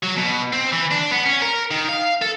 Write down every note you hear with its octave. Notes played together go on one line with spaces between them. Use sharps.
F#3
B2
C4
E3
D4
B3
C#4
A#4
D#3
F5
A4